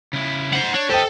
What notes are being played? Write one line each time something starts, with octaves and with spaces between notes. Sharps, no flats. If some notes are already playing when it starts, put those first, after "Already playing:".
C#3 E4
C5 F#5
D4 C#5
G4 A4 C5 D#5 G5